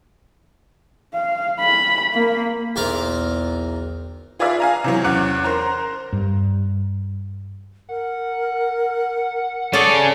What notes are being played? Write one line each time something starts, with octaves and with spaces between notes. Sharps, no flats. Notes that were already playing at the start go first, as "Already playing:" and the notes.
F5
B5
A#3
B1 E2 C4 A#4 F5 A#5
F4 G#4 B4 D5 E5 F5
F5 G#5 A#5
C3 E3 F#3
E2 C#4 D6 F#6 C#7
A#4 C5 A#5
G2
A#4 F#5
C#4 G#4 A4 C#5 D5